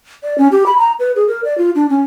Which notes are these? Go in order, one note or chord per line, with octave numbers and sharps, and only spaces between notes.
D5
C#4
G4
B5
A#5
B4
G#4
A#4
D5
F4
D4
C#4